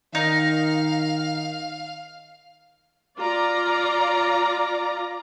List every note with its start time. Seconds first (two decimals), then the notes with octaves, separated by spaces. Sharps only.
0.15 D#3 D#4 F5
3.19 F4 D5 A#5